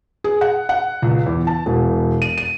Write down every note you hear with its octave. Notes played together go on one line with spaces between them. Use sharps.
G#4
F#5
F#5
C#2
E2
A5
E1
D#7
D#7